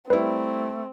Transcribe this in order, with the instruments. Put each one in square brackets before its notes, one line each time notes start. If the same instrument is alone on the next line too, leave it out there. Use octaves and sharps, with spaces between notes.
[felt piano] G3 E4 [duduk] A3 [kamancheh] C4 [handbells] B4